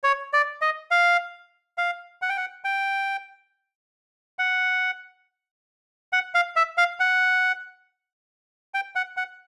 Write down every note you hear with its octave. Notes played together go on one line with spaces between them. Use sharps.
C#5
D5
D#5
F5
F5
F#5
G5
F#5
G5
F#5
F#5
F5
E5
F5
F#5
G5
F#5
F#5